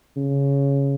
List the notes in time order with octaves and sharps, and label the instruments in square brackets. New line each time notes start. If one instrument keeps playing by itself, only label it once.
[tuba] C#3